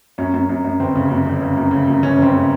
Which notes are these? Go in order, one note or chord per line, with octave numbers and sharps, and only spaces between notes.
F#2 C#4
F#2
F#2
F#2
G1 C4
C#3
F#2
G1
C#3
F#2
C#3
F#2
G1 C#4
G1 C4
C#3